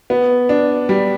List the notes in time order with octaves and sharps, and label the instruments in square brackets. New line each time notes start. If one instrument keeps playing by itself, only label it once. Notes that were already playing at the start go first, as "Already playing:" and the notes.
[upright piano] B3
D4
G3